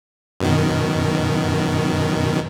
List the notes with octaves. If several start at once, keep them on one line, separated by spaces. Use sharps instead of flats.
F#2 B2 D#3